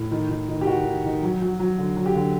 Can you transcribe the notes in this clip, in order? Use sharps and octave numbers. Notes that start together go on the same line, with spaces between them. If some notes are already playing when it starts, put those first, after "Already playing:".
Already playing: A2
D#3
D#3
D#3
G4
D#3 F#4
D#3
D#3
F#3
F#3
F#3
D3
F#3
G4
D3